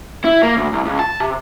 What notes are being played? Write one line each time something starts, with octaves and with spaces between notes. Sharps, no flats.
E4
A#3
D2
C2
C#2
A5
C3